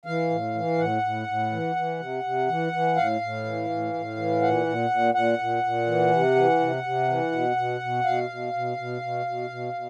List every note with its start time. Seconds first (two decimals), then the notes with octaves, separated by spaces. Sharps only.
0.05 E3 F5
0.30 A2
0.55 E3
0.78 A2 F#5
1.02 A2
1.28 A2
1.52 E3
1.76 E3
1.99 C3
2.23 C3
2.48 E3
2.72 E3
2.96 A2 F5
3.21 A2
3.45 E3
3.69 A2
3.94 A2
4.17 E3
4.42 A#2 F#5
4.66 A#2
4.90 A#2
5.14 A#2 F#5
5.39 A#2
5.63 A#2
5.86 E3
6.11 C3
6.36 E3
6.60 C3
6.83 C3
7.08 E3
7.31 B2
7.56 B2
7.81 B2
8.04 B2 F5
8.29 B2
8.53 B2
8.77 B2
9.02 B2
9.26 B2
9.50 B2
9.74 B2